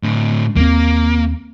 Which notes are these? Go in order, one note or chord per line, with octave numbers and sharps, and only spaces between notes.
A2 D3
D#2 G3 A#3 C4